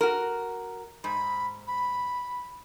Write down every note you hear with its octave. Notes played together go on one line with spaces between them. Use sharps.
F#4 A#4
G#2 B5
B5